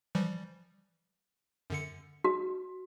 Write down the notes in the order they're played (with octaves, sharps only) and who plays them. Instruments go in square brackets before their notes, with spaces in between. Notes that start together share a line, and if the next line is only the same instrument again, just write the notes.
[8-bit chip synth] E3 F3 G3
F#2 D3 C#7
[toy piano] F#4